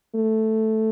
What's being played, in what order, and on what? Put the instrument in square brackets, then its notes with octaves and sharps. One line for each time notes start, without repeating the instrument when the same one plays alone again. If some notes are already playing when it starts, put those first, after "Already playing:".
[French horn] A3